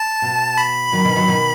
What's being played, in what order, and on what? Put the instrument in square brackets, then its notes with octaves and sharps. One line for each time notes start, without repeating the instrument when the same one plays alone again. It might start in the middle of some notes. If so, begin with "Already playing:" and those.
Already playing: [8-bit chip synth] A5
[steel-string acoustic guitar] B2
[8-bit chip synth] B5
[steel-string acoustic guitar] D#3 F#3
B2 D#3
D#3 F#3
B2 D#3